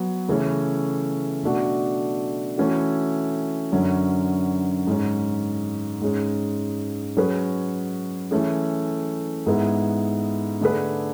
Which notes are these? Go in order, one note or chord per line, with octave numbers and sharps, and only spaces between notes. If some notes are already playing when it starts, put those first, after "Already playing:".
Already playing: F#3 B3 F#4
C#3 E3 A3 C#4
B2 A3 D4 F#4
E3 A3 C#4 F#4
F#2 D3 F#3 C#4
G#2 G#3 C#4
G#2 G#3 C#4
F#3 C#4 G#4 B4
E3 A3 C#4 G#4
G#2 G#3 B3 E4
D3 A3 D4 G#4 B4